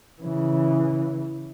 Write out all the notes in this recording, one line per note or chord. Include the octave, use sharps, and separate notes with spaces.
C#3 E3